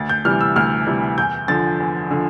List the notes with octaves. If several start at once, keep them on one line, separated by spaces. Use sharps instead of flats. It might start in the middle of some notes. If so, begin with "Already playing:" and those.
Already playing: D2 A6
G6
C3 E3 G3 F6
E6
D2 F6
C3 E3 G3
E2 G6
D3 F3 A6
E2
D3 F3